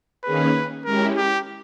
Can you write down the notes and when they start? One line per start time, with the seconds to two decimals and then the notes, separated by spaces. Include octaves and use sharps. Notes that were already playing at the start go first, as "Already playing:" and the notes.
0.23 D#3 A#3 C#4 G#4 B4
0.85 G#3 C#4 E4 G4 A#4
1.17 G4